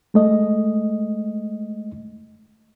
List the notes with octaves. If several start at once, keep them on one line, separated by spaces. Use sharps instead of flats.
G#3 A3 D#5